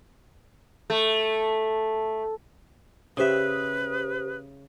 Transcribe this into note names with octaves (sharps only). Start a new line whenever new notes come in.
A3
C#3 G4 B4 C5 E5 D#6